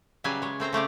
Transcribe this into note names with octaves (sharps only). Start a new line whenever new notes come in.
C#3 F#3 G3 B4 E5 G#5
G#3 C#5
A3 C4 C5 A#5
C#3 A3 G4 D5